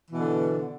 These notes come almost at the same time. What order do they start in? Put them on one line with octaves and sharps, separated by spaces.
E3 B2 D3